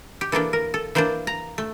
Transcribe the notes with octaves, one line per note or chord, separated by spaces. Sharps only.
G4
E3 A#3 D4 A4
A#4
A4
E3 A#3 D4 C5
A#5
A3